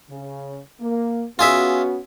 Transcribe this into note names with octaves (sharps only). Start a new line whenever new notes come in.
C#3
A#3
B3 C#4 F4 F#4 G#4 E5